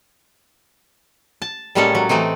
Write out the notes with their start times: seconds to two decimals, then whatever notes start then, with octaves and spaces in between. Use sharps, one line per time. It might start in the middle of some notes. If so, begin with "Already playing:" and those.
1.42 A5
1.75 A2 G3 G#3 A#3 C#4 A4
1.95 F#3
2.09 E3 A3 C4 D#4